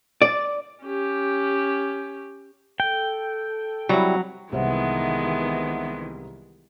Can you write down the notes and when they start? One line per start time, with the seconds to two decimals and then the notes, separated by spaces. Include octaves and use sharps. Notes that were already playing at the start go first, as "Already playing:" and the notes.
0.22 D5
0.84 C#4 G4
2.80 A4 G5
3.89 F#3 G3 C4 E4 G4
4.52 C2 D#3 E3 G#3 B3 C5 E5 F#5